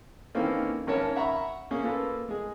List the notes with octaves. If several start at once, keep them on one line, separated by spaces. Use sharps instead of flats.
D#3 E3 A#3 C4 C#4 A4
G#1 C#4 A#4 C#5 A5
E5 F#5 A#5 B5 C#6
A#3 C#4 G#4
A#3 F4 A4 B4
G#3 G#4